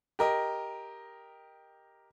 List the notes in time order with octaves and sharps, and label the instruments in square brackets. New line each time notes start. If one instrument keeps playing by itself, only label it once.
[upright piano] G4 A#4 D#5